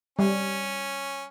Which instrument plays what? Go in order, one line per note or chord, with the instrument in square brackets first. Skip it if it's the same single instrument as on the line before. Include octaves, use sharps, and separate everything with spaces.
[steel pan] G3 [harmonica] C#4